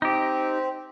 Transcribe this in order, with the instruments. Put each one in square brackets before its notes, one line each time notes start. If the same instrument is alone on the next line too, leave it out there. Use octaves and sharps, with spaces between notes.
[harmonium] C4 [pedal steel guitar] D#4 G4